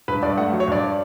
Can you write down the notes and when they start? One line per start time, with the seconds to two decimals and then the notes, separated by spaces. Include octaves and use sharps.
0.08 G2 B4
0.23 G2 D5
0.37 A3 F#5
0.53 F#3
0.60 C#5
0.68 G2 D5